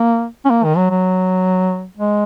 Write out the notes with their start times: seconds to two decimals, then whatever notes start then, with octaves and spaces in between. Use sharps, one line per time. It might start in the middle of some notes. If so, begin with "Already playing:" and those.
Already playing: A#3
0.45 C#4
0.50 A#3
0.64 D#3
0.76 F#3
0.90 F#3
1.97 G#3